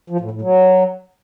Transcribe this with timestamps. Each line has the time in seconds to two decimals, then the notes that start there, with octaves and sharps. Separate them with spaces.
0.10 F3
0.20 A2
0.31 A2
0.41 F#3